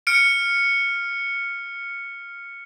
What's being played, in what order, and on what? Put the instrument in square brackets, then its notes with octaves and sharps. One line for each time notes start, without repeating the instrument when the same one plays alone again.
[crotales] F6 C#7 D7